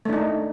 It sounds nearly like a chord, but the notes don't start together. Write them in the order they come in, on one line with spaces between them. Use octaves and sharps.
A3 D4 D#4